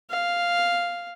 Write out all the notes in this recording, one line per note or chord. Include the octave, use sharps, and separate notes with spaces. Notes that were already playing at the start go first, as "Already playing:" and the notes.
F5